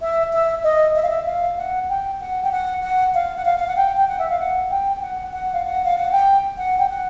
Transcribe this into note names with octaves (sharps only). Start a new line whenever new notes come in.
E5
E5
D#5
E5
F5
E5
F5
F#5
G5
F#5
G5
F#5
F#5
F5
F#5
F5
F5
F#5
G5
G5
F#5
E5
F5
F#5
G5
G5
F#5
F#5
F5
F#5
F5
F#5
G5
F#5
G5
F#5